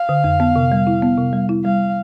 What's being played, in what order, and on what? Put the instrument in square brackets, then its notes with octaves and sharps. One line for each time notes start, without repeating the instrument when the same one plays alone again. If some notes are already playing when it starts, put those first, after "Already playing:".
Already playing: [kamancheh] F5
[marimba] D3
F2
B3
C3
G3
E4
B3
C3
G3
E4
[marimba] G3 [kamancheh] F5